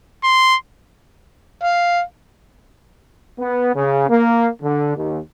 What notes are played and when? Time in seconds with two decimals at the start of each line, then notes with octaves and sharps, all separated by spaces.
0.24 C6
1.64 F5
3.39 B3
3.75 C#3
4.09 A#3
4.62 D3
4.96 D#2